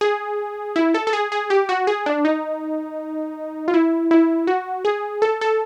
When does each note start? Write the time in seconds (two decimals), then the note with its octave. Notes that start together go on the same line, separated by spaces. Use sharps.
0.01 G#4
0.76 E4
0.94 A4
1.07 A4
1.13 G#4
1.32 G#4
1.50 G4
1.69 F#4
1.87 G#4
2.06 D4
2.25 D#4
3.68 F4
3.74 E4
4.11 E4
4.47 F#4
4.85 G#4
5.22 A4
5.41 A4